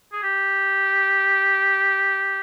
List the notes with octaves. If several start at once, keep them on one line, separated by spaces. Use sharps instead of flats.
G#4
G4